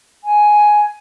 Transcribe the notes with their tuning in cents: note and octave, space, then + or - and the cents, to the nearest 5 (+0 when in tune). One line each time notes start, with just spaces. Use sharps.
G#5 +10